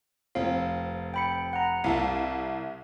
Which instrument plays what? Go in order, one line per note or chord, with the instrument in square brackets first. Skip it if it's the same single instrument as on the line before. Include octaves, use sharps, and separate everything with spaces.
[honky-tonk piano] F1 C4 [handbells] F5
[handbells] G5 B5 C#7
F#5 A#5
[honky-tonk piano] C2 E4 E5 [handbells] F5 A5